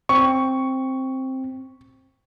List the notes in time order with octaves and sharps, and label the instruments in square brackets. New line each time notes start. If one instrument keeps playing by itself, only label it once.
[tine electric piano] C4 [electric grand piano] C#6